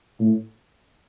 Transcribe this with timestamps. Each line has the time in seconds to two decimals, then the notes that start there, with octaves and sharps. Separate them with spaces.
0.19 A2